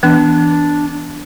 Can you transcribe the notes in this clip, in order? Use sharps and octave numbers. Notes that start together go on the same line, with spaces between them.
E3 B3 D4